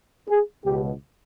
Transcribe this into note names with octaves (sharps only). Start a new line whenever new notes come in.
G#4
C#2 B2 G4